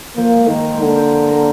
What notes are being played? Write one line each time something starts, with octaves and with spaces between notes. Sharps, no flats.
F3 A#3
G#3
D#3 A#3
C4
G#3
D3 A#3
C4
C4
A#3